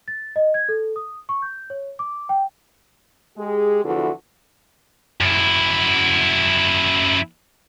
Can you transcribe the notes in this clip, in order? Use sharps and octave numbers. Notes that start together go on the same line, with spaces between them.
A6
D#5
G#6
A4
D#6
C#6
G6
C#5
D6
G5
G#3 G4 G#4
E2 D3 E3 F3 F#4 A4
F#2 E4